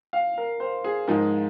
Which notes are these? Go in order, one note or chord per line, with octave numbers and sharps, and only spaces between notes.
F5
A#4
C5
G#4
G#2 F3 G#3 D#4 A#4